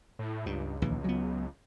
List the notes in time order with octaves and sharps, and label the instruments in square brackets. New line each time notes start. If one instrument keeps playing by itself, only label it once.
[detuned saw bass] A2
[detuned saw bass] C#2 [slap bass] G2
[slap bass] A#1 D#2 E3
F#3 B3